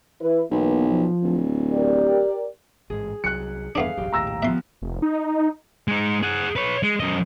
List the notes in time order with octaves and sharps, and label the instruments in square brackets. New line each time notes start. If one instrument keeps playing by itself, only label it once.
[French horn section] E3 E4 B4
[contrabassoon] B1 [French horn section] E3 A#3 B3
[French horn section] F3
[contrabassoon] D1
[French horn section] G4 A#4 D5
[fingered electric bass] A1 G#2 [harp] G#4
[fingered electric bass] C2 F#3 [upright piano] F#6 C#7
[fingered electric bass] E2 G2 [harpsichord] A3 B3 D4 [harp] G#4 F5
[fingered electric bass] E1 A1 F#2 [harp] G4
[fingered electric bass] A#1 D#2 A2 [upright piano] A#5 E6 A#6
[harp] F3 B3 [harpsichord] E5 C6
[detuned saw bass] F1
D#4
[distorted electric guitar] G#3 D#4
G#4 F#5
B4 C#5
G#3
F#2 D#5